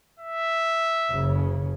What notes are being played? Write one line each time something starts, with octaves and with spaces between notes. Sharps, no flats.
E5
F#1 C#3